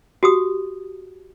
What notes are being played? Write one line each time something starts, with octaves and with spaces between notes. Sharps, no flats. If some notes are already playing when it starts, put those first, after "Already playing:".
F#4 G4 D#6